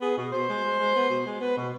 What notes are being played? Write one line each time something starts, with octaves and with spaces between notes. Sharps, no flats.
B3 G#4
B2
B2 C5
G#3
G#3
G#3
B3
B2
G#3
B3 B4
B2